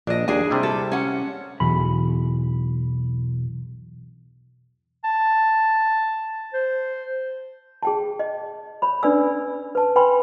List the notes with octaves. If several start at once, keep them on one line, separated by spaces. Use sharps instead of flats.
A#1 D4 D#5
D#2 D4 G#4 G#5
C3 G3 E4
A4
C#4 F#5
B1 E2 B5
A5
C5
G#4 G5 A5
D#5
C#5 B5
C#4 D4 B4 D5 G#5 E6
B4 A5
B4 G5 G#5 B5 C6